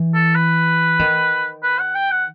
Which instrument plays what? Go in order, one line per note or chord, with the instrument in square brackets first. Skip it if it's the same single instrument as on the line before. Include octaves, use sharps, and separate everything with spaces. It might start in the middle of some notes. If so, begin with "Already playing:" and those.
Already playing: [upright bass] E3
[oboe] A4
B4
[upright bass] D#3
[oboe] B4
F#5
G5
F#5